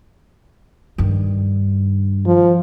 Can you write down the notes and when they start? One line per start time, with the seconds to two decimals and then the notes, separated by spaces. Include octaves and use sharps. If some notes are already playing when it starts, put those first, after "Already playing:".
0.98 G2 D#3
2.26 F3